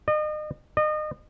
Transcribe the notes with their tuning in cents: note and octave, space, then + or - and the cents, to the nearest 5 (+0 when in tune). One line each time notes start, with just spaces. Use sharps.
D#5 -35
D#5 -30